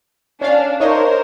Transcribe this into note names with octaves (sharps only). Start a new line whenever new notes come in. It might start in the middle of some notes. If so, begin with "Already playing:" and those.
C#4 D4 F5
D#4 A#4 C5 C#5